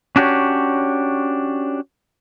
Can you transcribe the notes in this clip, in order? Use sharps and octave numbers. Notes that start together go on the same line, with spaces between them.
C#4 D4 F#4 G4 C#5